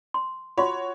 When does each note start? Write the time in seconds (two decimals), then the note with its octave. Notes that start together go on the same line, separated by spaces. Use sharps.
0.14 C6
0.58 F4 F#4 C#5 C6